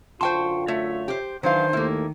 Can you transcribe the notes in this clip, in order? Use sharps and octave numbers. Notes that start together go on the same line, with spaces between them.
F#2 D3 F4 C5 G5 A5 C6 C#6
A3 C#5 E5
G4 C5
D#3 E3 F#3 D4 C5 F5
D#2 A3 A#3 E4